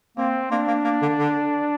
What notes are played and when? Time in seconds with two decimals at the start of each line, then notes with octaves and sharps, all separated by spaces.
0.17 A#3 C4
0.51 A#3 D4
0.68 A#3
0.85 A#3
1.02 D3
1.18 D3